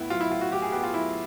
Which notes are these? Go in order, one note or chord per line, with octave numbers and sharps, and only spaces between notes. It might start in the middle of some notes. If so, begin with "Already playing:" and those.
Already playing: A2 B3 E4
F#3 F4
E4
A2 F4
F#4
A2 G4
G#4
B3 G4
F4
F#3 E4